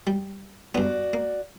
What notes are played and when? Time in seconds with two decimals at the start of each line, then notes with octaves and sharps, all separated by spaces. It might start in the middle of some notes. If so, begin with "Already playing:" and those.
0.07 G3
0.75 G2 B3 F#4 D5
1.13 A#3